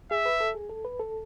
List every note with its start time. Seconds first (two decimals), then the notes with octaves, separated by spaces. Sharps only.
0.11 G#4 E5
0.26 B4
0.40 A4
0.55 G#4
0.70 A4
0.85 B4
0.99 A4